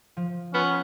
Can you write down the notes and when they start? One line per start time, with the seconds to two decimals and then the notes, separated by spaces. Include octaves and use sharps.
0.17 F3
0.54 B3 C#4 F4 F6 E7